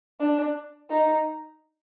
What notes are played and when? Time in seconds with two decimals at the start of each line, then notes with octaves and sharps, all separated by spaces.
0.20 D4
0.90 D#4